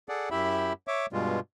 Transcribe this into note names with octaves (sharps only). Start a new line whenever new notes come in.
G#4 A4 D5 F#5
F#2 E4 G4 E5 B5
C#5 E5 D6
G2 B2 G3 G#3 F4